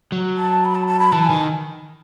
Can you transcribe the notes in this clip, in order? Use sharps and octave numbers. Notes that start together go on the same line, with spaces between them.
F#3
A5
B5
A5
A5
B5
E3 A5
D#3 G#5